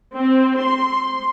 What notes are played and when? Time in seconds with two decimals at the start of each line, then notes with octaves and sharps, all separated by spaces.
0.16 C4
0.60 C6